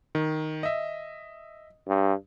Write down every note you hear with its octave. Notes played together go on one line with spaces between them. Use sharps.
D#3
D#5 E5
G2